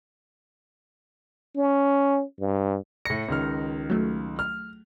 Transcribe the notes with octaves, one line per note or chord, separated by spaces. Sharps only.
C#4
G2
A2 A#6 C#7
C#2 D#3 F6
F#3 A3
F6